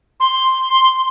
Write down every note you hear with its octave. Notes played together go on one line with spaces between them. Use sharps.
C6